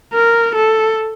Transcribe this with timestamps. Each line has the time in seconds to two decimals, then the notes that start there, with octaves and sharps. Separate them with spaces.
0.14 A#4
0.56 A4